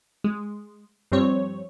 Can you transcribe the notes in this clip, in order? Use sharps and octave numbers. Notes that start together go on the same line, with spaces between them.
G#3
G2 F3 G3 C4 C#5